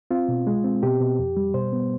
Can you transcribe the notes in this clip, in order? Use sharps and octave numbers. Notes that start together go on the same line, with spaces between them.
C4 F4
B2
G#3
C4
B2 G4
B2
F2
G3
B2 C5
B3